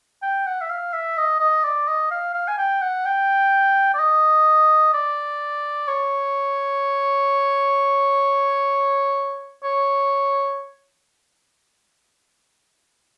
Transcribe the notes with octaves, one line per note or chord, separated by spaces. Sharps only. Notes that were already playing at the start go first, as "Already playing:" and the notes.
G5
F#5
E5
F5
E5
D#5
D#5
D5
D#5
F5
F5
G#5
G5
F#5
G5
D5
D#5
D5
C#5
C#5